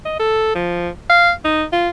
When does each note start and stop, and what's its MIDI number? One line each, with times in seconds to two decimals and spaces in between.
0.05 0.17 75
0.20 0.54 69
0.55 0.89 53
1.10 1.32 77
1.45 1.64 63
1.72 1.89 65